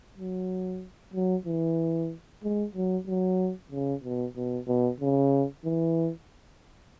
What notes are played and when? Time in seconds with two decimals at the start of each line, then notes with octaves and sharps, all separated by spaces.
0.18 F#3
1.14 F#3
1.46 E3
2.43 G#3
2.75 F#3
3.07 F#3
3.72 C#3
4.04 B2
4.36 B2
4.68 B2
5.00 C#3
5.65 E3